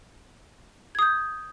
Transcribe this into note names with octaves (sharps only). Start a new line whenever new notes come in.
D#6 G6 G#6